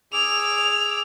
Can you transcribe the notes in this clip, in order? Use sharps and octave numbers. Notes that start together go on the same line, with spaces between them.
G#4 D6 E6 F7